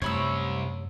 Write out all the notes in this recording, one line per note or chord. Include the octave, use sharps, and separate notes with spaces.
F#2 C3 G3 A3 C#5 B5 E6